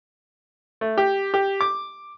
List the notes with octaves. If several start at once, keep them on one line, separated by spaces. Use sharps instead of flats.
A3
G4
G4
D6